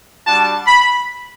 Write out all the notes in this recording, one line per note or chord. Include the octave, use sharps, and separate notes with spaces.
G3 D4 F#4 A5
B5